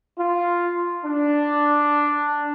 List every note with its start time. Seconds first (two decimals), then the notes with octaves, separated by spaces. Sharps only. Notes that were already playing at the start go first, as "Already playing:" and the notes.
0.18 F4
1.05 D4